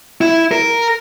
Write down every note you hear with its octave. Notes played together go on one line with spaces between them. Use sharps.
E4
A#4